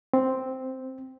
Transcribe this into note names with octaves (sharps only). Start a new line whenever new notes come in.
C4